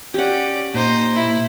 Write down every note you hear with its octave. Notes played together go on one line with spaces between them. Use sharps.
C#4 G4 D5 F#5
A#2 D#4 C5
E4